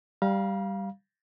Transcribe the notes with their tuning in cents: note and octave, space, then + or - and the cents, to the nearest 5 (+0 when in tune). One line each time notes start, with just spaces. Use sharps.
G3 +0 F5 +0 A#5 +45